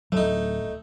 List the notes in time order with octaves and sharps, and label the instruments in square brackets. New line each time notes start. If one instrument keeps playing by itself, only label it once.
[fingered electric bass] D1 F#3 [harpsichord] A3 D#4